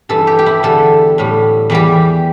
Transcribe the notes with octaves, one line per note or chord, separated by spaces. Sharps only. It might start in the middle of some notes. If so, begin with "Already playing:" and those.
G2 E3 G3 A4
G4
G4
E4
E2 D3 G3 A4
A2 G3
E2 E3 G3 G4